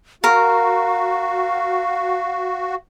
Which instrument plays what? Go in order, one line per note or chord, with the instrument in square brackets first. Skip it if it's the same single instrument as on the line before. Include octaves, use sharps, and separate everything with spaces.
[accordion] F#4 [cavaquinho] A#4 [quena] F5